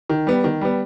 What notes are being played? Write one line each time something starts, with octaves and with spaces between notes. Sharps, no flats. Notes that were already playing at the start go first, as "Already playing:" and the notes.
D#3
G3 B3
D#3
G3 B3